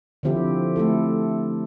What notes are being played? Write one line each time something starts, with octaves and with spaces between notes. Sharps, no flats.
D3 F3 C4 E4 G4
A3 C4 E4 A4